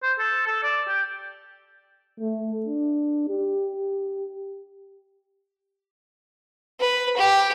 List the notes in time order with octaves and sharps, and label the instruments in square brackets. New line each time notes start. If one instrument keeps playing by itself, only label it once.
[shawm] C5
A4
A4
D5
G4
[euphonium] A3
D4
G4
[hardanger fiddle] B4
G4